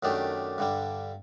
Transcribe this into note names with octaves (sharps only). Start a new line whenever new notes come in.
F#2 D#3 A3 D4 G4
G2 D3 G3